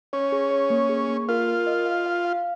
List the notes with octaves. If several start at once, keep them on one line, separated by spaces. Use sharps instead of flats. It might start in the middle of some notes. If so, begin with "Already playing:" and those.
C#4 C#5
G#4
C#5
A#3
G#4
A#3
F4 A#4
A#4
D#5
F5
F5
F5